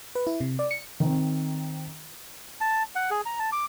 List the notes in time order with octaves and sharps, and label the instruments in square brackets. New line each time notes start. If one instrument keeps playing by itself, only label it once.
[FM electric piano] B4
E4
C3
D5
C#7
[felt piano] D#3 C4
[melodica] A5
F#5
G#4
A#5
A5
D6